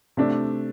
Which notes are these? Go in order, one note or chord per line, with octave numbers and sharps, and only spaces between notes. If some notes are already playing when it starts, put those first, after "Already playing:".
C3 A3 D4